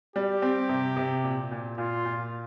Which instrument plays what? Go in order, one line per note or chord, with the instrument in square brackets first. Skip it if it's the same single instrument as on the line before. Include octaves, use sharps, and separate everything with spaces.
[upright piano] G3 [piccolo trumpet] G4
[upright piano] C4
C3
C3
A#2
A#2
[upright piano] A#2 [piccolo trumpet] F4
[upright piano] A#2